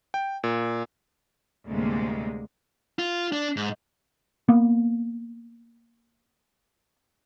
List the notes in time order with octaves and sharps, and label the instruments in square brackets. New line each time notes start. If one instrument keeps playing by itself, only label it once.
[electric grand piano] G5
A#2
[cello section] D2 A2 C3 G3 G#3 A#3
[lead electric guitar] F4
D4
G#2
[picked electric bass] A#3 B3